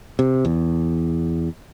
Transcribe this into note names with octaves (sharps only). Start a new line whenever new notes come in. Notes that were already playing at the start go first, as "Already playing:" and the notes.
C3
E2